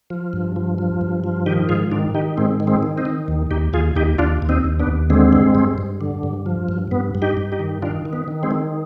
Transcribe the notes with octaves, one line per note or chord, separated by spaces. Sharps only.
F3
G2
F3
F3
G2
F3
D#3 D#4 G4
G#2 F4 G#4
D#3 D4 F4
D#3 D#4 G4
G#2 G#3 C4
D#3
G#3 C4
D#3
C4 D#4
D#3
D#2
D#2 D#4 G4
D#2 F4 G#4
D#2 D#4 G4
D#2 D4 F4
D#2
C4 D#4
D#2
B3 D4
D#2
D3 G#3 C4
G2
G2
G2
D3
G2
F3
G2
G2 B3
G2
D#4 G4
G2
D#4 G4
D#3
D#3 D4 F4
D#3
B3
D#3
G#3 C4
D#3